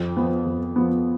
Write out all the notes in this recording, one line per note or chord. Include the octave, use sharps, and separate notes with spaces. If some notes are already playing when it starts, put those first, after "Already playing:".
Already playing: F2
F3 B3
F2
F3 B3